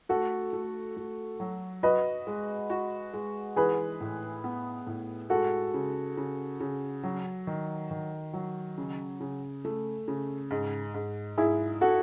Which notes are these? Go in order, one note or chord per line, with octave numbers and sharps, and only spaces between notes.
A3 F#4 A4
A3
A3
F#3
F#4 B4 D#5
G#3
F#4
G#3
E3 G#4 B4
A2
B3
A2
G#3 F#4 A4
C#3
C#3
C#3
F#3
D#3
D#3
F#3
C#3
C#3
A3
C#3
G#2
G#2
G#2 E4 G#4
F#4 A4